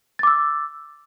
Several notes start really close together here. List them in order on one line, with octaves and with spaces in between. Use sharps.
A6 D6 E6